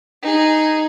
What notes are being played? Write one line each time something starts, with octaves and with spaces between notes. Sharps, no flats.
D#4 G#4